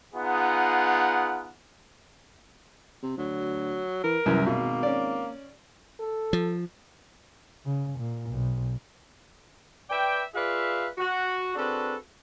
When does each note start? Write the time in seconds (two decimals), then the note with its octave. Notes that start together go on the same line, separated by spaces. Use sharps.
0.14 B3 D#4 F4 G#4 F#5
3.03 C3
3.18 D2 F#3
4.04 E3 A#4
4.26 C2 F#2 E3
4.46 G#1 B2 A#3
4.83 C#4 D5
6.00 A4
6.33 F3
7.65 C#3
7.99 A#2
8.30 B1
9.90 B4 D5 E5 G5
10.34 F4 G#4 B4 D5 E5 F5
10.98 F#4
11.55 C4 D4 F#4 G#4 A4 B4